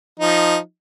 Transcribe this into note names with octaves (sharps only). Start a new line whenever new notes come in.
F3 D#4